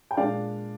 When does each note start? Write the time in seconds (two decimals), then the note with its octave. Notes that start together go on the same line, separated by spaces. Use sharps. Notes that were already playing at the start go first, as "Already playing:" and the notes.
0.11 G5
0.17 A#2 G#3 D4 D5 F5